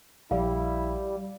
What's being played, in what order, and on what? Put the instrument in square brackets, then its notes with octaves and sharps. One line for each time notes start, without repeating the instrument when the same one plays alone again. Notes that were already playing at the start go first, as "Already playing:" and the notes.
[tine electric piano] A#1 [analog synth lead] G3 [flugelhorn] E4 [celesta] F5